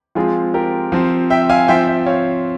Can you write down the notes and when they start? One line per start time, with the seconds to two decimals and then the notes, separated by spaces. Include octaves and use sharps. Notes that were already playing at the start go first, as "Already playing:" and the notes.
0.15 F3 G#3 C4 F4 G#4
0.54 G4 A#4
0.92 F3 C4
1.30 E5 G5
1.50 F5 G#5
1.68 F3 C4 E5 G5
1.87 E5 G5
2.06 C#5 F5